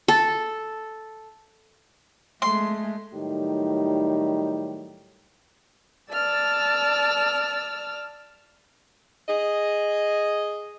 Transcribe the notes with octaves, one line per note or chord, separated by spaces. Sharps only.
A4
G#3 A3 C6
A2 D#3 F#3 G3 D#4 G4
D5 A5 E6 F6
G#4 D#5